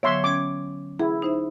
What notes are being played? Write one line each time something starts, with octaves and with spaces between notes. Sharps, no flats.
D3 F#3 B3 C#5 E5 C6
C#4 D6 G#6
E4 G#4
D#4 C5 E5